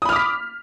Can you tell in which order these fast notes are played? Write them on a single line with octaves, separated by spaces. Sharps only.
D#6 B5 F6 D6 B6